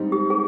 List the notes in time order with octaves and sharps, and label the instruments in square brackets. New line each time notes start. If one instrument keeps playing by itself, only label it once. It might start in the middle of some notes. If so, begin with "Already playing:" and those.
Already playing: [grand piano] G#2 G3 C4 D#4
[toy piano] G4
G#4